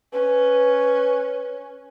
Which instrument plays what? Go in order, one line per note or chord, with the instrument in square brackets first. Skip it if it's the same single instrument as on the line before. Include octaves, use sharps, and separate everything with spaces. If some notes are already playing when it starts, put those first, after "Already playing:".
[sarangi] C#4 [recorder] B4